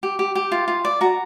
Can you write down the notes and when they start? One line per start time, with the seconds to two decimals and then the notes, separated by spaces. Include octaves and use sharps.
0.03 G4
0.19 G4
0.35 G4
0.52 F4
0.68 F4
0.85 D5
1.01 F#4 A#5